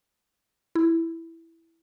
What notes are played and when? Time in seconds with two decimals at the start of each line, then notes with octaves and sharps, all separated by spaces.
0.75 E4